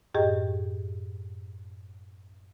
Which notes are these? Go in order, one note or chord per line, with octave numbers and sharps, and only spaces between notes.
F#2 A2 G4 G#4 D#5 G5